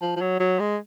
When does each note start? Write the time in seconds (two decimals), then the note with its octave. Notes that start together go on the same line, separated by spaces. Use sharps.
0.02 F3
0.16 F3
0.21 F#3
0.40 F#3
0.60 G#3